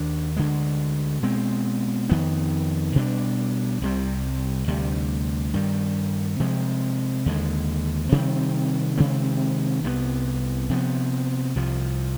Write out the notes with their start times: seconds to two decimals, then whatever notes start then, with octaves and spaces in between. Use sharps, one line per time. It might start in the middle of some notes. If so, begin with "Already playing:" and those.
Already playing: D#2 D#3 D4
0.36 D2 D3 G#3
1.23 B2 G#3 C4
2.09 F2 D#3 B3
2.95 B2 G3 D4
3.82 C2 C3 G3
4.67 D2 C3 G3
5.53 G2 D#3 G3
6.40 C3 F3 G#3
7.26 D#2 D3 G#3
8.12 C3 D#3 G3 C4
8.97 C3 D#3 G#3 C4
9.84 C2 C3 G3 B3
10.69 C3 F3 B3
11.55 C2 C3 F3